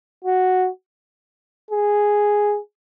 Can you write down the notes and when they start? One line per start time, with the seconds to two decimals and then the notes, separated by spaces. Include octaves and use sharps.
0.24 F#4
1.71 G#4